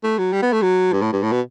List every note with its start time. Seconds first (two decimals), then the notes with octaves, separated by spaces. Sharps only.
0.04 A3
0.18 F#3
0.33 G3
0.43 B3
0.53 A3
0.62 F#3
0.92 G2
1.02 A2
1.13 G2
1.23 A2
1.32 B2